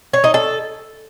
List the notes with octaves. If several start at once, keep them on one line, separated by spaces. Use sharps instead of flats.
C#5
D#4
A4